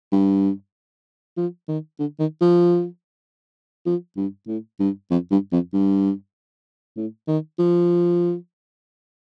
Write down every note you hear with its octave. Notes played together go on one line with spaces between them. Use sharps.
G2
F3
D#3
D3
D#3
F3
F3
G2
A2
G2
F2
G2
F2
G2
A2
D#3
F3